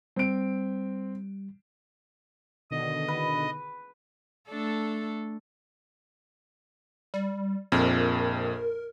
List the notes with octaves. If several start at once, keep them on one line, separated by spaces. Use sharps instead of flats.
G3 C4 D7
B2 D3 D#3 D#5
B4
A3 D4 A4
G3
A#1 F2 A#4